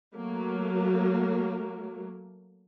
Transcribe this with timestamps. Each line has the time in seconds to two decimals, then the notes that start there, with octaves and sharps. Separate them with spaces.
0.15 F#3 A3 A#3